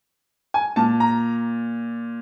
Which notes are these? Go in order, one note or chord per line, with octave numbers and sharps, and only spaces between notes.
G#5
A#2 A5
A#5